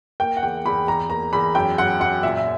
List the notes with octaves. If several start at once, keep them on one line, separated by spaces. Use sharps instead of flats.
A#3 G5
F#5
E2 G5
E2 B5
E2 A#5
A#3 A#5
E2 B5
F#2 G5
F#2 F#5
F#2 F#5
A#2 E5
E5